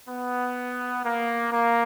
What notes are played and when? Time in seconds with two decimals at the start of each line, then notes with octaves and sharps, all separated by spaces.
0.09 B3
1.05 A#3
1.52 A#3